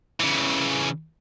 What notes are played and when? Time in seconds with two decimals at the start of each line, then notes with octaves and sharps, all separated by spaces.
0.20 C#3 E3